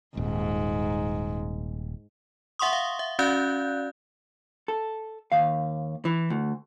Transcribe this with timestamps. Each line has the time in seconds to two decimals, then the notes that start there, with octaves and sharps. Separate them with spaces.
0.17 D#1 G#2
2.59 E5 F#5 C6 C#6 D#6
2.73 F5
2.99 E5
3.19 C#4 F#4 D5 F5 F#6 G6
4.68 A4
5.32 D#2 F5
6.05 E3
6.30 D2